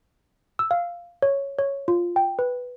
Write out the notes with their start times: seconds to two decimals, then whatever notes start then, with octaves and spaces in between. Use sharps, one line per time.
0.59 E6
0.71 F5
1.22 C#5
1.59 C#5
1.88 F4
2.16 G5
2.39 B4